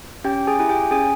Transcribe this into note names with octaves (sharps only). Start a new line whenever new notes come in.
C#4 G4 G5
G#4 G#5
E4 G4 G#5
G4 G5
C#4 G#4 G#5